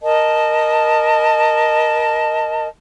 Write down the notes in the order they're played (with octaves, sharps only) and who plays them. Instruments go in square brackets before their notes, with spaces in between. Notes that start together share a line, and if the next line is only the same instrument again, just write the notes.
[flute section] A#4 D#5 A5